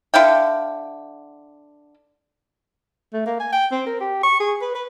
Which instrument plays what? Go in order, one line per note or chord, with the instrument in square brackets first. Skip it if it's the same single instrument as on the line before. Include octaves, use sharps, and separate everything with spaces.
[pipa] D3 E4 F5 G5
[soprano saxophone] A3
A#3
G#5
G5
C4
A#4
G4
C#6
G#4
B4
B4